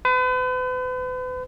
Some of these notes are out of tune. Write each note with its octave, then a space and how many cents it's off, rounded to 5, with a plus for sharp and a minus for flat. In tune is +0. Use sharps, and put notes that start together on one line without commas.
B4 +40